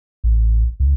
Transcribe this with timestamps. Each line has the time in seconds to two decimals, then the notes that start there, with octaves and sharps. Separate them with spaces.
0.24 A1
0.80 C#2